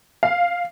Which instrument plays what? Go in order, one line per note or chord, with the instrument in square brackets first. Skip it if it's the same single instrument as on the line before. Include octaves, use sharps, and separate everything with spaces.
[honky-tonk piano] F5